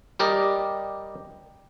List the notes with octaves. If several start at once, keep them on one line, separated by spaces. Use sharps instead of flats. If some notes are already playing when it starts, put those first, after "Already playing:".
G3 G4 A#4 D5 D#5